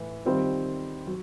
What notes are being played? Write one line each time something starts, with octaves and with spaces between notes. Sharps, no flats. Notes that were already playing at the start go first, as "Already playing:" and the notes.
Already playing: A2 E3
D#3 G3 C4 F4
F#3